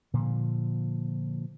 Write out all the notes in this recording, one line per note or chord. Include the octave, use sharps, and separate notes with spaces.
A#2 D3 F3